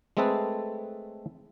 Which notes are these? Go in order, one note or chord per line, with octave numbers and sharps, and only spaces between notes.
G#3 A3 C4 G#4 A4 B4